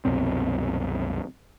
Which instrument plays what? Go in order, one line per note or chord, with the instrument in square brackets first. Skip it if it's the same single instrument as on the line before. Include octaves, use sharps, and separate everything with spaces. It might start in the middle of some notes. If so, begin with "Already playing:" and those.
[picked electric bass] C2 F#2 B2 C4